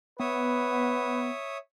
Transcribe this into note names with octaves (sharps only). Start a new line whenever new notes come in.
B3 B4 C#5 E5 D#6